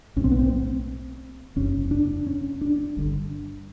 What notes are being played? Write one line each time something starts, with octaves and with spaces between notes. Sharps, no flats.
B1 A2 C#4
C4
B3
C4
F#1 E2 C3 C#4
D4
C#4
D4
G1 G2 D3